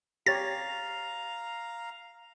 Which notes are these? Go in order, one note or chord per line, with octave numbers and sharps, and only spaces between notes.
G4 C#5 F5 A#5 A6